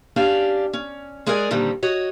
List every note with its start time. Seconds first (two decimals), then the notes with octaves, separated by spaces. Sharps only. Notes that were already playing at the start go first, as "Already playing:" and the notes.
0.16 C#4 D4 G4 D5 F5
0.73 C#4
1.26 G#3 G#4 A#4 D5 G#5
1.51 A#2 D3 D#3 G3 C4
1.83 F#4 C#5 D#5